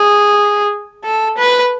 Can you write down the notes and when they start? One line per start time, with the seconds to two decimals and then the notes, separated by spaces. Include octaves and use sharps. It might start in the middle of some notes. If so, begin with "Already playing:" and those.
Already playing: G#4
1.04 A4
1.37 B4